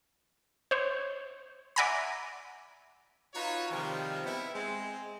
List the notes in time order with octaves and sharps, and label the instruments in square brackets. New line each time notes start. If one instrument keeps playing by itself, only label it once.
[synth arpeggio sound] C5 C#5
D5 E5 F#5 G#5 A#5 B5
[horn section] D#4 F4 F#4 B4 C#5
C3 D#3 F3 G3 G#3
B3 C4 E4
G#3 C4